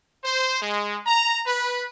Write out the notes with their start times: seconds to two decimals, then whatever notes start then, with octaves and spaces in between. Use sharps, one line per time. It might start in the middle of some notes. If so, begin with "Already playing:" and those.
0.24 C5
0.61 G#3
1.07 A#5
1.46 B4